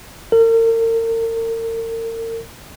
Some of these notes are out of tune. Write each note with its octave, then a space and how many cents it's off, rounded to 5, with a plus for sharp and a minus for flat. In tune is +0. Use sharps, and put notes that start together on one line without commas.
A#4 -40